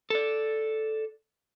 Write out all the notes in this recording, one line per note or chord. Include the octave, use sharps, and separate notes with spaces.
A4 D5